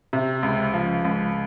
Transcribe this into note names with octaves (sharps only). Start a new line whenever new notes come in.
C3
C#2
F3
C#2